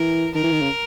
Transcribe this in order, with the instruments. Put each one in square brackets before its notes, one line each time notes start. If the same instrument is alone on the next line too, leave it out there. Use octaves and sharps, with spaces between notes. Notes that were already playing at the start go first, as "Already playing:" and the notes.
Already playing: [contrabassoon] E3 [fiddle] A#4
[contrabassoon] D#3 [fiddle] A#4
[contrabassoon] E3
D#3
C#3